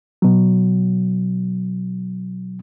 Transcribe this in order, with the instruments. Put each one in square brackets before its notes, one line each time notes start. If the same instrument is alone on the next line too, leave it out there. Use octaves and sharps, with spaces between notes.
[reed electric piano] B2 F#3